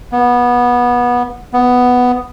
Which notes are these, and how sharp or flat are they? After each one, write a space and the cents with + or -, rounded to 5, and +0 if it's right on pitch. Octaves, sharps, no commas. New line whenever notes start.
B3 -20
B3 +5